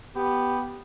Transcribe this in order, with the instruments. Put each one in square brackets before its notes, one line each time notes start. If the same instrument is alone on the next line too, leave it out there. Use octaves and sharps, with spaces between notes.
[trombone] B3 [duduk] G4